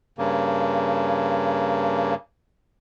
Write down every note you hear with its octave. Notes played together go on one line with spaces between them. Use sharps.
G2 C#3 A#3